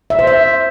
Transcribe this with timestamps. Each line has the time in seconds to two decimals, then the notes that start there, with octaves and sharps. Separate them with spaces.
0.10 E5
0.19 C5
0.27 E5